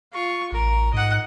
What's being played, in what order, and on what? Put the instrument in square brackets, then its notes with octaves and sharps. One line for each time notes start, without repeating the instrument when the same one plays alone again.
[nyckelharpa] F4 C#6
[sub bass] A1 [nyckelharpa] A#4
[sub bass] G#2 [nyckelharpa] D#5 F#5